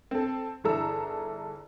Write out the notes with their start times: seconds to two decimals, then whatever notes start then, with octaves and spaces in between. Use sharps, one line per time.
0.11 C4 A4
0.64 G1 E3 G#4 A4 A#5 E6